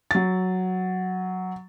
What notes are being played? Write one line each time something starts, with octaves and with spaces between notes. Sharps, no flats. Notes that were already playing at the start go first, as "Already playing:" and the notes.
F#3 A6